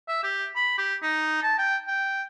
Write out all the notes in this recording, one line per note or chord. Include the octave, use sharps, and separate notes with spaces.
E5
G4
B5
G4
D#4
A5
G5
G5